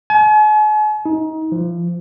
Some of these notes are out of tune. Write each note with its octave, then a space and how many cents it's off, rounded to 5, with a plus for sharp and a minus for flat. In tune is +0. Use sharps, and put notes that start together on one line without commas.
G#5 +45
D#4 +25
F3 -25